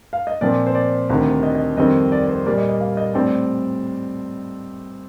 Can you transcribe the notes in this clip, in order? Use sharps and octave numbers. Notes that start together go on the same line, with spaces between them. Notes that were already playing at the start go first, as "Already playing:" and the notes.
F5
D#5
A#2 F3 C4 D5
C5
D5
D2 C3 D#3
D#5
D#5
F2 D#3 G3 C4 D#5
D5
D5
C5
A#2 G3 A#3 D5
D#5
D#5
F5
D#5
A2 G3 C4 D5